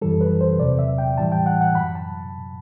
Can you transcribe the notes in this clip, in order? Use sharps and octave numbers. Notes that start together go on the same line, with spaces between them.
F#2 E3 G3 A4
B4
C5
E2 C3 F#3 D5
E5
G5
A2 E3 G3 A5
G5
F#5
F#5
F#2 F#3 B5
A5